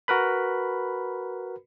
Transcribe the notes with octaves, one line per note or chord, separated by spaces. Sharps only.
F#4 A#4 B4 B5